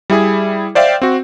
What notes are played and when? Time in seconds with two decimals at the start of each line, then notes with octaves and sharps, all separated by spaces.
0.10 G3 E4 G#4
0.75 C5 D5 E5 F5 G5
1.02 C4 F#4